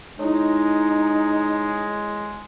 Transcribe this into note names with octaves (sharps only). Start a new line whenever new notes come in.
G#3 D#4 E4 C#5